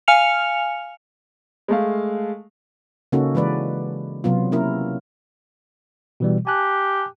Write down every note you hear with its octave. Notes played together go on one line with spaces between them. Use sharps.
F5 G#5 F6 C#7 F7
G#3 A3 F5
C#3 A#3 C#4 D#4 F#4 A4
E3 G#3 B4 D5
C3 F#3 B3 F4
A#3 C#4 E4 A#4
B2 E3 G3
G4 G#5 A5 F#6